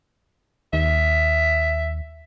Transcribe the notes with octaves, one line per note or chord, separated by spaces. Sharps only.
D#2 E5